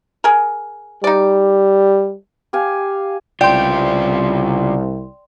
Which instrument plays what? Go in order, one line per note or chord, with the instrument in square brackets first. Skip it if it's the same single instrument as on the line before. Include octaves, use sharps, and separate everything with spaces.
[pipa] G#4 A#4
[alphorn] G3 [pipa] D#4 D5
[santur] G4 F5 G#5
[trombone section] C2 [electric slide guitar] C#3 F4 [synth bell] D5 C6 [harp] G5